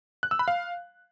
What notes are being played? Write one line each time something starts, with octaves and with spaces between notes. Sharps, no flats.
F#6
E6
B5
F5